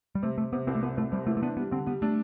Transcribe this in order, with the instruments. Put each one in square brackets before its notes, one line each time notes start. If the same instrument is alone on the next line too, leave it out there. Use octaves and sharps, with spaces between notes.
[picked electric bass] G3
[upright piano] C3 [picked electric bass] A3
[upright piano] C3 [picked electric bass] A3
[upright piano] C3 [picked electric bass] B3
[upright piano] C2 [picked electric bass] C4
[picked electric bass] A3
[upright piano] C2 [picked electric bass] B3
[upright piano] C2 [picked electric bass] A3
[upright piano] C3 [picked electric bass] G3
[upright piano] E3 [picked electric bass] A3
[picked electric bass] A3
[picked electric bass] B3 [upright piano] D4
[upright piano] G3 [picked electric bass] B3
[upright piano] D3 [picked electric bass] C4
[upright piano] G3 [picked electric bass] B3
[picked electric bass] A3 [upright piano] D4